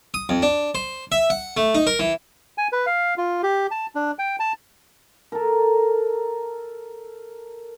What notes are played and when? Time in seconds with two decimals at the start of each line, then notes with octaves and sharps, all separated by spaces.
0.14 D#6
0.29 F2
0.42 D4
0.75 C5
1.12 E5
1.30 F#5
1.57 A3
1.75 D#4
1.87 A#4
2.00 E3
2.58 G#5
2.72 B4
2.86 F5
3.18 F4
3.43 G4
3.71 A5
3.95 D4
4.19 G5
4.40 A5
5.32 A4 A#4